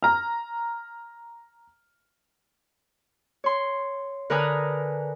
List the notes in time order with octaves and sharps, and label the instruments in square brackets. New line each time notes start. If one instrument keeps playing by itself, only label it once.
[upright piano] A#5 F6
[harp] C#5 C6
D3 A#4 B4 G#5 A#5 D#6